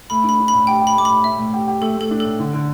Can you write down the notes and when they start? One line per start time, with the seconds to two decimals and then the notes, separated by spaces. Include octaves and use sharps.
0.10 A3 B5
0.24 D4 B5
0.39 D4
0.48 B5
0.53 A2
0.67 G4 G5
0.81 G4
0.87 B5
0.96 A3 D6
1.05 A2 B5
1.24 A3 E5
1.38 A2
1.54 G4
1.68 G4
1.81 A3 A4
1.97 A3 A4
2.11 D4
2.20 A2 A4
2.39 D3
2.54 D3